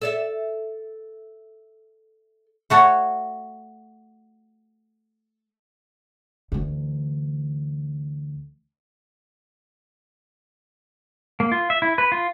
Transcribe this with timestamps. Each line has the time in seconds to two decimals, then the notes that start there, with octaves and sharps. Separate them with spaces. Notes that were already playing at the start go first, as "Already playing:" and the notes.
0.01 A4 D5 E5
2.70 A3 F#4 C#5
6.52 D2 E3
11.40 A#3
11.52 F4
11.70 E5
11.82 E4
11.98 B4
12.12 F4